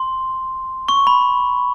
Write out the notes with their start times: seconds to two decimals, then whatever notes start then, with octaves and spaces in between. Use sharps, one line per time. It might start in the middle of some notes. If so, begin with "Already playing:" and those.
Already playing: C6
0.88 C#6
1.07 B5